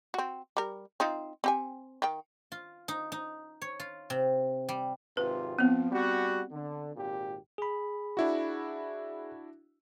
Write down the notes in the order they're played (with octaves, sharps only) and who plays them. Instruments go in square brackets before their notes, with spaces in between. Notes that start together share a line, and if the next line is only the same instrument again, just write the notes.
[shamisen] C4 F#4
G3 A#4
C4 D#4 F4
C4 G4 G#5
D#3 G5
[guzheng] F4
D#4
D#4
C#5
F4
C3
G3
[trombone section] G#1 C3 F4 [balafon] B4
[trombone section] F3 [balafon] B3 C4
[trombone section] G3 F#4
D3
G#1 A#2 G4
[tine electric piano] G#4 B5
[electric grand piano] D4 E4 F#4